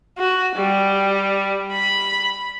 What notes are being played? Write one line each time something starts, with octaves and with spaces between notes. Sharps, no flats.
F#4
G3
B5